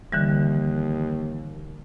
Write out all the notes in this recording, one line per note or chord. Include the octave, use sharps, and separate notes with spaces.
D#2 D3 E3 G3